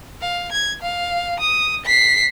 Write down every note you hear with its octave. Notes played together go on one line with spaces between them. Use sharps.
F5
G#6
F5
D#6
B6 C7